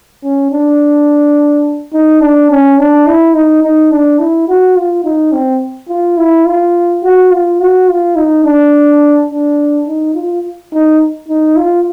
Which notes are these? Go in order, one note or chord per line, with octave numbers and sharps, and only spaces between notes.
C#4
D4
D#4
D4
C#4
D4
E4
D#4
D#4
D4
E4
F#4
F4
D#4
C4
F4
E4
F4
F#4
F4
F#4
F4
D#4
D4
D4
D#4
F4
D#4
D#4
F4